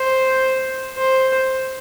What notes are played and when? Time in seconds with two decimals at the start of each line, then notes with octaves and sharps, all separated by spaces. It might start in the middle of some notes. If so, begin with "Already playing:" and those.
Already playing: C5
0.97 C5